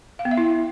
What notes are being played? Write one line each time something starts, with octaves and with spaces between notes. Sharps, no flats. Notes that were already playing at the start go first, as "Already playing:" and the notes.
F5
B3
E5
E4